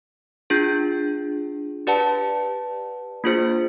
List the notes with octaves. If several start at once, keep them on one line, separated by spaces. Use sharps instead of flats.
D4 F4 G#4
G4 B4 D5 F#5 A5
A#3 D4 F4 G#4 C5